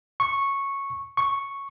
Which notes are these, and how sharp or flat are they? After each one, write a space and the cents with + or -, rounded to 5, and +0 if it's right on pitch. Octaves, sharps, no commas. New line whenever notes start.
C#6 -10
C#6 -5